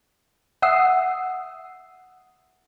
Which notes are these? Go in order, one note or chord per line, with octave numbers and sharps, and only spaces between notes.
E5 F#5 D#6 E6 C7